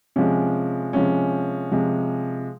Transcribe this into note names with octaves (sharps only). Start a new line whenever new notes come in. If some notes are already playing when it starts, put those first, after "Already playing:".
C3 F3 G#3 C#4
C3 F3 G#3 C#4
C3 F3 G#3